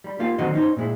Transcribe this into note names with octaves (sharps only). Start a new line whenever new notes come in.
G3 B5
A#3 F4 G4 F5
D3 D#3 F#3 C4 F#4 D#5
C#4 D#4 C5
A#2 G#3 E4